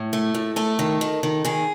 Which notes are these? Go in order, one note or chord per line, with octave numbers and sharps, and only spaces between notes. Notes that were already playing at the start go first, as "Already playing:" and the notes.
Already playing: A2
A3
A2
A3 A4
D#3
D#3
D#3
D#3 G#4